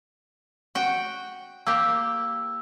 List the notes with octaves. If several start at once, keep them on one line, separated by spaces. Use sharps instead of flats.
F#4 G5
A#3 G4 E6